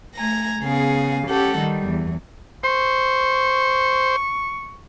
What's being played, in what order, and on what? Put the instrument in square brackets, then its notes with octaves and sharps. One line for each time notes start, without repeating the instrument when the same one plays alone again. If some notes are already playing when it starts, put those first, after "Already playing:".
[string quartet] A3 G#5 A#5 A#6
C#3 B3 G#4 F5
C#4 G4 A4 F#5
D#3 G3
E2
[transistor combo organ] C5 [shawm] C#6